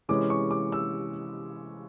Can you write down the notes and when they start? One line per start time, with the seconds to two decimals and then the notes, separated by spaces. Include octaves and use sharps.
0.09 C3 E3 G#3 C#4 D6
0.30 C#6
0.51 D6
0.72 E6